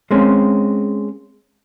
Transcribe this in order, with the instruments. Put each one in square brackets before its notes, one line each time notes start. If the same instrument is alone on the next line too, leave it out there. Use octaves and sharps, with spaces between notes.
[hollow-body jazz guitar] G#3 A#3 C4 C#4